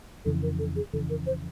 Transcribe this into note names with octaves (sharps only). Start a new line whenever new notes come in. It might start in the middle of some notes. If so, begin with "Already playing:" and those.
F2 C#3 E3 A4
A#4
A4
G#4
F2 C#3 E3 A4
A#4
C5